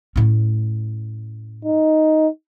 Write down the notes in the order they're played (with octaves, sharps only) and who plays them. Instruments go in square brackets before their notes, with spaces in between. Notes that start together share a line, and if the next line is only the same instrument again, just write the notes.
[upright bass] A2 C#4
[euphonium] D#4